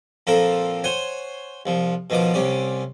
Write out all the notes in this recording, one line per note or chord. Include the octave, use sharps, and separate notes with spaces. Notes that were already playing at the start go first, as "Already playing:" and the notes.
A#2 F3 C4 A4 A#4
C5 C#5 F#5 G#5 C6 C#6
C2 F3
B2 D#3 F3 D6
C2 C3 C#4 D5